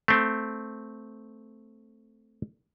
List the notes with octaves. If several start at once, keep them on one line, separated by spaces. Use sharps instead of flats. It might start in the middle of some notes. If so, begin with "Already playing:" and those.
A3 C4